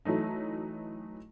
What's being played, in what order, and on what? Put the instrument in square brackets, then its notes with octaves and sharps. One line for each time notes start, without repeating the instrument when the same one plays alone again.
[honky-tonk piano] E3 F#3 A3 D#4